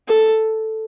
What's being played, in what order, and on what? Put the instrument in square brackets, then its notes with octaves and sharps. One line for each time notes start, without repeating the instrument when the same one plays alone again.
[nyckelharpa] A4